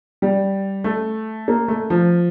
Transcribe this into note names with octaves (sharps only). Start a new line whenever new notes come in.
G3
A3
A#3
A3
F3